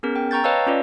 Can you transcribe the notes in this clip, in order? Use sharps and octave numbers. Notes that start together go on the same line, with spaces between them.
B3 C#4 G#4 A#4
G5
G5 A#5 C#6 G6 A6
B4 C#5 D#5 F5 A5 E6
C#4 F4 B4 D5